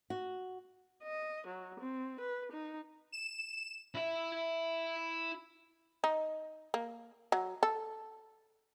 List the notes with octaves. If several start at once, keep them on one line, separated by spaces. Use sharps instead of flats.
F#4
D#5
F#3
C4
B4
D#4
E7
E4 E5
D#4
A#3
F#3
A4